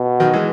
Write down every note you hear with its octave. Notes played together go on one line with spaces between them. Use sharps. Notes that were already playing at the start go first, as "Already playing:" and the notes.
Already playing: B2
D#3 F#3
E3 G#3